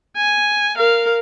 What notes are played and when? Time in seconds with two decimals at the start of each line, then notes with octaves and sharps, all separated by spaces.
0.17 G#5
0.77 A#4 F5